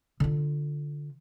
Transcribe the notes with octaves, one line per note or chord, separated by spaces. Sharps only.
D3 F4